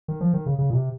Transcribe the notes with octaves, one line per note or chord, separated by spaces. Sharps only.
D#3
F3
D#3
C#3
C#3
A#2
C3